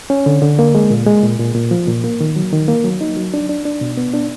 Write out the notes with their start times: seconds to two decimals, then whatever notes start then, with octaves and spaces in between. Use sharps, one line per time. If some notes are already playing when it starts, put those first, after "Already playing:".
0.10 C#4
0.26 D3
0.42 D3
0.59 A#3
0.75 G#3
0.91 A#2
1.06 G#3
1.23 A#2
1.39 A#2
1.55 A#2
1.71 F3
1.88 A#2
2.04 A#3
2.21 D#3
2.36 F#3
2.52 D#3
2.68 A#3
2.84 F#3
3.01 D#4
3.17 F#3
3.34 D4
3.49 D4
3.65 D4
3.81 B2
3.97 B3
4.14 D4